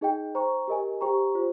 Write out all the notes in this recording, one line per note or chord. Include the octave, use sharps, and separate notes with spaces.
D#4 G#4 D#5 G5
C5 G5 A#5 C#6
G4 A#4 D#5 G#5
G4 C5 G5 A#5 C#6
F4 C5